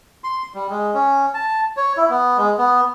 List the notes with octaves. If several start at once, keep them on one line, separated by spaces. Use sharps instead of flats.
C6
G3
G#3
C#4
A5
C#5
E4
B3
G#3
B3